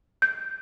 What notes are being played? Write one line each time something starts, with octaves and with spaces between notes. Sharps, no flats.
G6